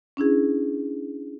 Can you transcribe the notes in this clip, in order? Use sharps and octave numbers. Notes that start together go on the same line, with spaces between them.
C#4 D4 E4 G#4